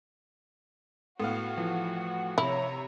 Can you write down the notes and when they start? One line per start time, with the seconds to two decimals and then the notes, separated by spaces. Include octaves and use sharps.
1.20 A2 B3 F#4 F5
1.57 E3 F3
2.38 C3 E4 C#5 A#5 F7